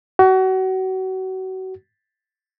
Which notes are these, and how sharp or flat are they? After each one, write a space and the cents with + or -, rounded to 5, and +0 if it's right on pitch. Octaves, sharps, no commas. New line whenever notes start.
F#4 +30